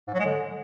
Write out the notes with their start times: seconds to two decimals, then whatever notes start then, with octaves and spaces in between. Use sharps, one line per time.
0.07 G#2
0.13 F#3
0.19 G#3
0.25 D3